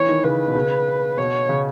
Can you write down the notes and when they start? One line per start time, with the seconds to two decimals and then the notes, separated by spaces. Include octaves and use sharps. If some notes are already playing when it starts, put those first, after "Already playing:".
Already playing: E3 C#5
0.09 D#3
0.24 C#3 B4
0.48 B2
0.55 C#3
1.17 B2 C#5
1.49 C#3